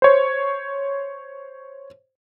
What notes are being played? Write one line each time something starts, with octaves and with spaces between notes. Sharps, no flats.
C5 C#5